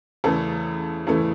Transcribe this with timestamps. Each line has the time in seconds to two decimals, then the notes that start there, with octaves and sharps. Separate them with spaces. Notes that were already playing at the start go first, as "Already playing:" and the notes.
0.24 E2 C#3 E3 A3 A4
1.07 E2 C#3 E3 A3